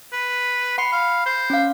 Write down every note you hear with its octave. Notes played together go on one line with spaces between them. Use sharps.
B4
F#5 B5 C6 C#7
F5 B5
C5
C#4 F5